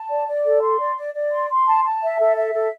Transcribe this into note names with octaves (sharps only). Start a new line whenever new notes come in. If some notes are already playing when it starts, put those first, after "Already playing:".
Already playing: A5
D5
D5
A4
C6
D5
D5
D5
C6
C6
A5
A5
E5
A4
E5
A4